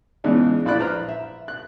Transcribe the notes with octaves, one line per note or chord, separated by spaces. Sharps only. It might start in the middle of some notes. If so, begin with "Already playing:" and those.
C#3 E3 G#3 B3 D4 D#4
A#1 E4 D5 B5 F#6
B4 C5 A#5 B5 F6
E5
F#6